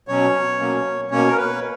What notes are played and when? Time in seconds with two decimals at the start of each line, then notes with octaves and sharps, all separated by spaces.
0.08 B2 F#3 C#4 C#5
0.59 B2 F#3 A#3 C#4
1.11 B2 A#3 C#4 C#5
1.29 A#4
1.37 B4